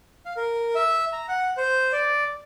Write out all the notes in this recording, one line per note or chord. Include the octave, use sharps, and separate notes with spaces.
F5
A#4
E5
A#5
F#5
C5
D5